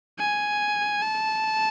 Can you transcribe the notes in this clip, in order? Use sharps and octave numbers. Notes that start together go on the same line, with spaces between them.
G#5
A5